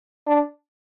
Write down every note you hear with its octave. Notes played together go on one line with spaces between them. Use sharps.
D4